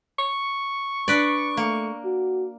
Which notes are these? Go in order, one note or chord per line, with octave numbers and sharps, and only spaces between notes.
C#6
D4 B4 D5
A3 A#3
F#4